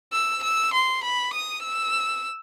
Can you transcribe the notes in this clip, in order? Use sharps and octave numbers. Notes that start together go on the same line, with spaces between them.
E6
E6
C6
B5
D#6
E6